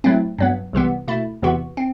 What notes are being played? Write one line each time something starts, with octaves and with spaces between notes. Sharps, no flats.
A2 F#3 A3 C4
G2 F#3 B3
C2 C3 E3 B3
B2 A3 E4
E2 C3 E3 B3 F#4
C4